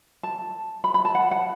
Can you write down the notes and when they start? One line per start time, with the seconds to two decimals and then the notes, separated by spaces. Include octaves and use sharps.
0.23 A5
0.84 B5
0.94 B5
1.05 A5
1.15 F#5
1.31 F#5